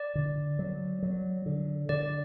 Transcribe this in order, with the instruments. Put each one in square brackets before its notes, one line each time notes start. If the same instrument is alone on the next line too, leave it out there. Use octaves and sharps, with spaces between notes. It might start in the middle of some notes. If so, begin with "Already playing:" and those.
Already playing: [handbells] D5
[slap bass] D3
F#3
F#3
D3
[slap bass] D3 [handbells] D5